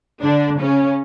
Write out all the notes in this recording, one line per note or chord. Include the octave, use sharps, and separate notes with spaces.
D3 D4
C#3 C#4